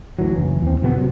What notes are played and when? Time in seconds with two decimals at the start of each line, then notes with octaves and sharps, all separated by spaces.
0.19 D2 E3 F#3
0.36 F#1 E3
0.62 D#2 C4
0.81 D1 F2 C3 B3
0.97 C3 F#3